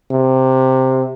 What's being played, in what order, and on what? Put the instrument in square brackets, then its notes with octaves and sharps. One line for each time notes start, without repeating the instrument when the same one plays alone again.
[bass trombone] C3